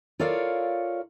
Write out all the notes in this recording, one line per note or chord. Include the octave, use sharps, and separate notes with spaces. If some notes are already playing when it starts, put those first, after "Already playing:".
F4 A4 A#4 C#5 D5 F5